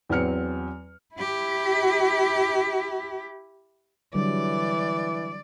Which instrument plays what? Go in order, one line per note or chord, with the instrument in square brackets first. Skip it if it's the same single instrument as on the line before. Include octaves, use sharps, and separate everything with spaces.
[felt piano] E2 F#3 C4 F6 C#7
[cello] E4 G4
[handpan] D3 F#3 G3 [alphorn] E3 [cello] D5